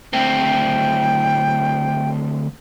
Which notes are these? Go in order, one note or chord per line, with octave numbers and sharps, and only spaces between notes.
D2 C4 G5